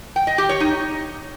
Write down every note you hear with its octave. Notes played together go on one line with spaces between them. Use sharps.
G5
D#5
G4
C#5
D#4